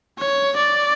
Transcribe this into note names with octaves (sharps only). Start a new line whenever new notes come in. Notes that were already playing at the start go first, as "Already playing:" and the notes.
C#5
D5